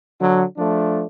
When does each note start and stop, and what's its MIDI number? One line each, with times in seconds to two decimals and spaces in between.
0.19 0.43 50
0.19 0.43 54
0.57 1.04 53
0.57 1.04 57
0.57 1.04 62